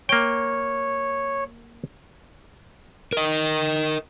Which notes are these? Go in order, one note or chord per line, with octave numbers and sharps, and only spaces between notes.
A#3 C#5 G5
A#4 D#5